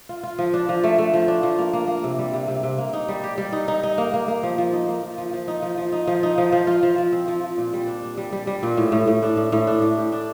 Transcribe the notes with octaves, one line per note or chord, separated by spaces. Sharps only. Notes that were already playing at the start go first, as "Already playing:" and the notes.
F4
F4
F3
D4
F3
A3
A3
F3
D4
F3
A#3
A#3
A#3
C3
G3
C3
C3
C3
A#3
D#4
G3
G4
G3
D#4
D#4
D#4
A#3
A#3
A#3
F3
F3
D#4
A#3
F3
F3
F3
D#4
F3
F3
D#4
F3
D#4
F3
F3
F4
F3
F3
C4
F3
F3
A#2
G3
D4
D4
G3
G3
G3
A#2
A2
A2
A2
D4
A2
A2
D4
A2
G4
D4